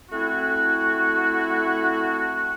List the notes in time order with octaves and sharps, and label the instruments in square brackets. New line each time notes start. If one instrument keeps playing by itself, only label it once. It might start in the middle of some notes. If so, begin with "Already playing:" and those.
[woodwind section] A3 C4 E4 F#4